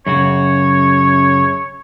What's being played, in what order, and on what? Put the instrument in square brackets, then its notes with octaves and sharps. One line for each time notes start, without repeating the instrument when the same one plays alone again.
[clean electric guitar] F#2 C#3 F#4 [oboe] C#5